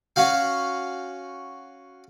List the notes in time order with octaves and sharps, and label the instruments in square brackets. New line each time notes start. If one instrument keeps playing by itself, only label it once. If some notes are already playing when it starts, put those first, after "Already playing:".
[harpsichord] C#4 F#4 F5